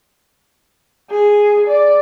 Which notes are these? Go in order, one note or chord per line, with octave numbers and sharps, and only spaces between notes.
G#4
D5